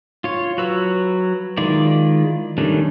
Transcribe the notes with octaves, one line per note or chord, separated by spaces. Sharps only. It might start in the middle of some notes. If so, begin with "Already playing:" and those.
F4 C#5
F#3 F#4 B4 E6
D#3 G#3 E4 F4 D5
D#3 G3 A3 C#4 D4